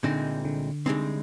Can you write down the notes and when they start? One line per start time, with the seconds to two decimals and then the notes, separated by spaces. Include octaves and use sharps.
0.03 C2 A#2 D3 G#3 C4 D#4
0.45 D3
0.86 C2 A#2 D3 G#3 C4 D#4